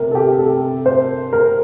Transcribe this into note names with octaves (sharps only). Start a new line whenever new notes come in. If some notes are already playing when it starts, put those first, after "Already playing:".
Already playing: C3 A#4
A4
G4
A4
C5
A#4